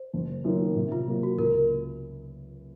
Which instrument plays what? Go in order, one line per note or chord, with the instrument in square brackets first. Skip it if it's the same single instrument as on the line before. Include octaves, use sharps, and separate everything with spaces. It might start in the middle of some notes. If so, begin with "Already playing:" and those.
Already playing: [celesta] C5
[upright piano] F#1
F#2 D#3 A#3
C3
[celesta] F4
[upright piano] F#3 A#3 F4 A#4
[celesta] F#4
[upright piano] C#2 [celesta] A#4